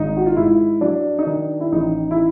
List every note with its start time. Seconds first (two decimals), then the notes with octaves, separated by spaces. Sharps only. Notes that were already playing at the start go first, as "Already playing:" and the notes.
Already playing: G#1 D#4
0.17 F#4
0.26 F4
0.36 G#2 E4
0.81 F#3 D4
1.19 D#4
1.26 D#3 D4
1.60 E4
1.72 A1 D#4
2.11 E4